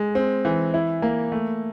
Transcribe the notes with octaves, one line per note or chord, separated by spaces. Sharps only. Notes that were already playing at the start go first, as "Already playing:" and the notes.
Already playing: G#3
C4
E3
E4
A#3
A3